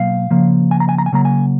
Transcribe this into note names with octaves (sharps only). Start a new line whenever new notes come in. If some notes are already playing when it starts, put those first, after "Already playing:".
Already playing: B2 F#3 A#3 F5
C#3 F3 A#3
G#5
A#5
G#5
A#5
G#5
C#3 F#3 A#3 A#5
G#5